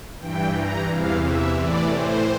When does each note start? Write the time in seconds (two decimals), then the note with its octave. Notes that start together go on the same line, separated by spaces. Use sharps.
0.20 G2 E3 G5
0.55 A#5
0.90 E2 C3 E3 F5
1.24 E5
1.59 A2 E3 D5
1.93 C5